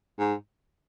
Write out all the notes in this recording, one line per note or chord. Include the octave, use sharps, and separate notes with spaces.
G#2